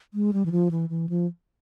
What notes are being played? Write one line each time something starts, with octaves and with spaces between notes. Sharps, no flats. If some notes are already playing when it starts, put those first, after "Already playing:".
G#3
G3
E3
F3
E3
E3
F3